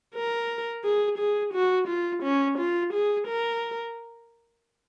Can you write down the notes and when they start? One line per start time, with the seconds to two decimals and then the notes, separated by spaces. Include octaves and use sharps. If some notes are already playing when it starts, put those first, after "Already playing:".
0.15 A#4
0.84 G#4
1.18 G#4
1.54 F#4
1.88 F4
2.23 C#4
2.58 F4
2.93 G#4
3.28 A#4